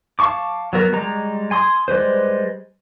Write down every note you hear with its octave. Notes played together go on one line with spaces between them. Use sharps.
F5 A5 C#6 D6
F#3 B3 A#4
G3 G#3 A#5
G#5 C6 D#6
G3 G#3 B4 C5